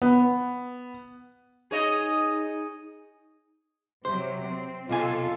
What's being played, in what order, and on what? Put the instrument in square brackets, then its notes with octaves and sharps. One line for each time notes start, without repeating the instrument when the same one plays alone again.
[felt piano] B3
[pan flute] D#4 [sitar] G#4 C#5 D#5
[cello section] C3 F#3 [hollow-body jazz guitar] C5
[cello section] C4
[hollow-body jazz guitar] B1 C3 G#5 [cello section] F4 A4